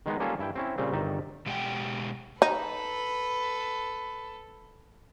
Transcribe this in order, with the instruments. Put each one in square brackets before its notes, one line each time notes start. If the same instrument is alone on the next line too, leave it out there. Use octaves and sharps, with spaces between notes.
[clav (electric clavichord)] D#3 G#3 B3 D#4
G3 A#3 C#4 F4 G#4 A4
G2 E4 G5
C4 C#4 E4
A#2 C#3 G3 C4
G1 D#3 D#4 D5 E5 G5
[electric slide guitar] B2 G#3 G4 C5 F#5 G5
[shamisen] D#4 [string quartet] A4 B4